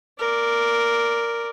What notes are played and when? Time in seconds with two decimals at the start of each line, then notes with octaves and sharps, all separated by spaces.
0.19 A#4 D5